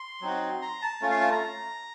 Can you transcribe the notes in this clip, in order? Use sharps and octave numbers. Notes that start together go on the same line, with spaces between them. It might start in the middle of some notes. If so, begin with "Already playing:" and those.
Already playing: C6
F#3 C4 D#4 F#4
A#5
A5
A3 C#4 F4
F5
A5
A#5